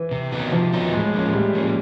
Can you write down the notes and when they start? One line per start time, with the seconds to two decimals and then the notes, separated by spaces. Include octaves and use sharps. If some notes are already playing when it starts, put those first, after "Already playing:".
Already playing: E3
0.11 C3
0.31 D#3 F#3 B3 D#4
0.52 C3 F3
0.72 D#3 F#3 B3 D#4
0.93 A2 G#3
1.13 F3 A#3 C#4
1.33 A2 G3
1.53 F3 A#3 C#4